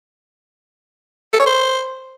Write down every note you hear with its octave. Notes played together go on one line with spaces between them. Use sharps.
A4
C#5
C5